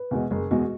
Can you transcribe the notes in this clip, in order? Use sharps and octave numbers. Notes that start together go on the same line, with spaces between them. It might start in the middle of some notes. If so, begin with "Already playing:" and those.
Already playing: B4
E2 B2 G#3
F#1 G#4
E2 B2 G#3 F#4